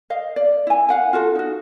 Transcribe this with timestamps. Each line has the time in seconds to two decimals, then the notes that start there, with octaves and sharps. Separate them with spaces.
0.10 D#5 F5
0.36 D5
0.67 E4 G#5
0.89 F5 F#5 G#5
1.13 F4 F#4 A4
1.35 D#4 F#4